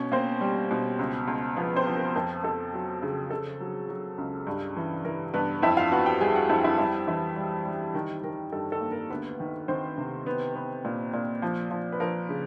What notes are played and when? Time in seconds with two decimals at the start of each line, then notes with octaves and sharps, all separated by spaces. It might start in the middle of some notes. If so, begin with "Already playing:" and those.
Already playing: B2 C#4 C#5
0.12 A#3 C4 C5
0.41 G3
0.71 B2
0.99 C#2
1.28 C#2
1.57 F3 B3 B4
1.76 C4 C5
1.87 F3
1.96 A#4
2.15 F2 A#4
2.44 F2 A4
2.73 F#3
3.02 C#3
3.30 C#3 A4
3.60 F#3
3.89 F#3
4.18 C#2
4.47 G2
4.77 E3
5.05 E3 A#4
5.34 G2 B3 B4
5.62 F2 E4 E5
5.77 F4 F5
5.92 B3 F#4 F#5
6.06 G4 G5
6.21 G3 G#4 G#5
6.36 F#4 F#5
6.49 F2 E4 E5
6.64 E4 E5
6.78 G3 E4 E5
7.07 E3 E4 E5
7.36 G3
7.66 G3
7.94 D#3 A#4
8.23 D#3 A#4
8.52 G2 A4
8.72 A4
8.81 A#3
8.92 A#4
9.10 D2 B3 B4
9.40 D#3
9.68 D#3 C4 C5
9.98 C3
10.26 B3
10.55 B3
10.85 A#2
11.13 A#2
11.42 F3
11.71 F3
11.92 B4
12.00 F3 A#4
12.29 C#3